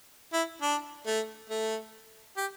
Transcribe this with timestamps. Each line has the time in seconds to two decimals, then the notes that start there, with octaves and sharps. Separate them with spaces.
0.33 E4
0.62 D4
1.07 A3
1.50 A3
2.37 G4